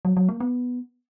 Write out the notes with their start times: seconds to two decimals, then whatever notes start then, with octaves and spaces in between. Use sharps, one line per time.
0.05 F#3
0.17 F#3
0.29 A#3
0.40 B3